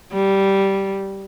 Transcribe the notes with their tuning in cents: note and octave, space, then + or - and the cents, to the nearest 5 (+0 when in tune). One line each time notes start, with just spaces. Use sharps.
G3 -10